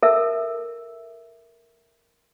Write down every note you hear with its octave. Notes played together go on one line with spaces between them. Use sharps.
A4 A#4 E5